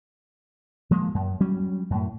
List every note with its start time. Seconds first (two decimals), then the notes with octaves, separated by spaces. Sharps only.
0.91 F3 G#3 A#3
1.15 F#2
1.40 F#3 G3 C#4
1.90 F#2 A2